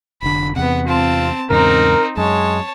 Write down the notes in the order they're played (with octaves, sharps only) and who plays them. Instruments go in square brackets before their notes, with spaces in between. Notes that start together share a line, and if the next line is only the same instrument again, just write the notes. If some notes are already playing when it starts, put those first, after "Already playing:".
[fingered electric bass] F1 D3 [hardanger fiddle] B5
[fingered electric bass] E2 C3 [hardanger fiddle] B3 F#5
[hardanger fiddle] C4 A5 [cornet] F4
[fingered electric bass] E2 G#2 C#3 [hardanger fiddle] C4 D#4 [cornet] A#4
[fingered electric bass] F#2 [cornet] G#3 [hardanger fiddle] C#5 A5